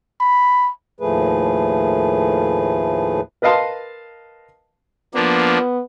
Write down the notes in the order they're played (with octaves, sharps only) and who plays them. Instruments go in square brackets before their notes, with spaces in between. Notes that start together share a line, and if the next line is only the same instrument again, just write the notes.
[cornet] B5
[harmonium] D#2 A2 F3 A3 G#4 B4
[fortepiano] A#4 B4 D#5 F5 A5 C6
[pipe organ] F3 A#3 D4 [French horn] B3